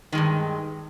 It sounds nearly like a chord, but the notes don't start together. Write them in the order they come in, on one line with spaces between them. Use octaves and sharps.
D#3 G#3 G2